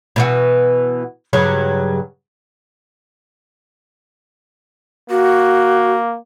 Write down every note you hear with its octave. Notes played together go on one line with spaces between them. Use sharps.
B2 E3 F#4
G2 C#3 F#3
A#3 F#4